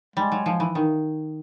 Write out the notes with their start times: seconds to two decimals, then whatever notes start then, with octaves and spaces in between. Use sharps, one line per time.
0.16 G3 G#3
0.32 F#3
0.46 F3
0.60 E3
0.75 D#3